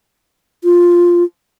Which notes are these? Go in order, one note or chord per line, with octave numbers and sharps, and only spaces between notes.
F4